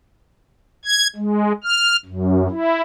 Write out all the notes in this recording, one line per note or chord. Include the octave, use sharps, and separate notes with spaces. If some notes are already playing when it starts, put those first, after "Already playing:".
G#6
G#3
F6
F#2
E4